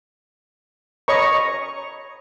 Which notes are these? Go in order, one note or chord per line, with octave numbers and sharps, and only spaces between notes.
C#5 D#5 A#5 B5 C#6